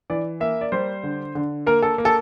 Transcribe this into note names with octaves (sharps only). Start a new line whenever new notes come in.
E3 D5
A#3 E5
D5
G3 C5
D3
D3
A#3 A#4
A4
A#3
A4